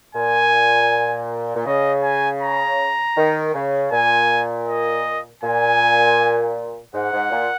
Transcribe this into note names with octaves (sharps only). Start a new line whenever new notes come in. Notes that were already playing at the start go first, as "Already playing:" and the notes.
A#2 G#5
A#2
C#3 D#5
G#5
A#5
D#3
C#3
A#2 G#5
D#5
A#2 G#5
G#2 F#5
G#2
A#2